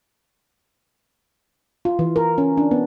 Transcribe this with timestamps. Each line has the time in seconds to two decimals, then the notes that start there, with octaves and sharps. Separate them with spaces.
1.85 F4
1.99 E3
2.16 A#4
2.38 C#4
2.57 D4
2.71 B3